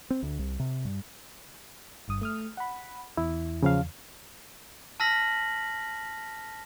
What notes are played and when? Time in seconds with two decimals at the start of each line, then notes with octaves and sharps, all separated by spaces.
0.10 C4
0.22 D2
0.39 C2
0.59 C3
0.85 G2
2.08 G1 G2 D#6
2.21 A3 D#6 F6
2.57 F#5 B5
3.17 E2 E4
3.63 C#3 F3 F5
5.00 A5 E6 F6 A#6 B6 F#7